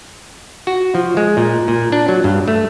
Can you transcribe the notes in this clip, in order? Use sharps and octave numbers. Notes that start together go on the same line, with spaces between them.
F#4
F3
G#3
A#2
A#2
D4
F#3
G2
A3